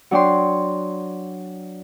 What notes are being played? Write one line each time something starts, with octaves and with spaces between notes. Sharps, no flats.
F#3 D4 G5 C6